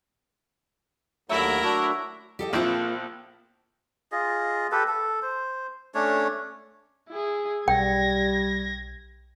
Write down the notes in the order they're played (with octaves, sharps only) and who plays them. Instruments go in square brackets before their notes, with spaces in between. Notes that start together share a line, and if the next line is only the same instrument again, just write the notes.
[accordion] D#2 D3 [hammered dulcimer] F#3 A3 [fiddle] E4 A#4
[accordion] D4 F#4 E6
[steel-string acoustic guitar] G4 A4 D#5
[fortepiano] A#1 C4 E4 [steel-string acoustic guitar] A#3 F4
[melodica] F4 G#4 D#5
G4 A4 B4
A4
C5
A3 C#4 D4 C#5
[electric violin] E4 G#4
[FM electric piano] B1 [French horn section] G3 [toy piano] G5 [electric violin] G#6 A#6